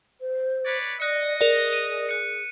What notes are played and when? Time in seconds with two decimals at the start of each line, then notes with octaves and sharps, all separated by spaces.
0.20 C5
0.65 B4 C#5 D5
1.00 D5 D#5 F#6 C#7
1.41 G#4 A#4 D5
1.73 D#7
2.09 F#6 C#7